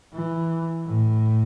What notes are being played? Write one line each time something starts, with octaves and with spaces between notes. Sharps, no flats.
E3
A2